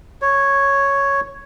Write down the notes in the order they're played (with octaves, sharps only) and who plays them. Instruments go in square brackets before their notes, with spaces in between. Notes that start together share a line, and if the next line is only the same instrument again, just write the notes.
[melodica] C#5